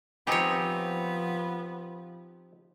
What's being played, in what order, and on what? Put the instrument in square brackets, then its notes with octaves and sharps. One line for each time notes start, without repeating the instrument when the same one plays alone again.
[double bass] F3 [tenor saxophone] B3 [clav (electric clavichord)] C4 D#4 G4 [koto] G#4 C#5